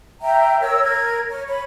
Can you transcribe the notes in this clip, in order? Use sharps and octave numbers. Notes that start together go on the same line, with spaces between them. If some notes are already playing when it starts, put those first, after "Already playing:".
E5 G5 A#5
A#4 C#5 E6
A#4 G#6
C#5
C#5 B5